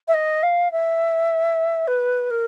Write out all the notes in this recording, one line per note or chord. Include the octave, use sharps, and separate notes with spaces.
E5
D#5
F5
E5
B4
A#4